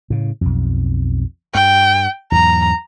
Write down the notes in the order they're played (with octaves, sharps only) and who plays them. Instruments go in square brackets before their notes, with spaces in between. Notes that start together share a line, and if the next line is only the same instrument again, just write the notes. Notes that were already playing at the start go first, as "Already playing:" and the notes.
[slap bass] A2 C#3
B1 F2
[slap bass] G2 [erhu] G5
[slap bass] E2 G#2 F#3 [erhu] A#5